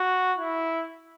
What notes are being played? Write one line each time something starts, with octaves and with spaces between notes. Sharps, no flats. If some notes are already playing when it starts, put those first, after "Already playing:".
Already playing: F#4
E4